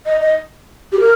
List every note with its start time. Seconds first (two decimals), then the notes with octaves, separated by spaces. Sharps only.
0.06 D#5
0.21 D#5
0.92 G4
1.00 A#4